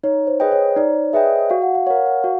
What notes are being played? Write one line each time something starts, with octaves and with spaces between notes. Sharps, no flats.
D#4 C#5
C5
G#4 B4 D#5 G5
C#5
D#4 D5
G#4 B4 D#5 E5 G5
F#4 F5
F#5
F5
A#4 C#5 F#5
F5
F#5
F#4 F5